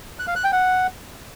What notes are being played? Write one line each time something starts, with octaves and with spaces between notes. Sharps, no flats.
F#6
F5
F#6
G5
F#5